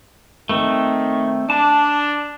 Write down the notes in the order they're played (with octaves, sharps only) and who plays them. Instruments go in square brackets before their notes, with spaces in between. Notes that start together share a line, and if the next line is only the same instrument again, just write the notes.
[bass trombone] D#3 [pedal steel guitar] A3 C4
[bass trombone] D4 [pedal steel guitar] A5